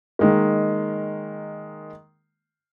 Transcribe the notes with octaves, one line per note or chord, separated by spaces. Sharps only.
D#3 G#3 A#3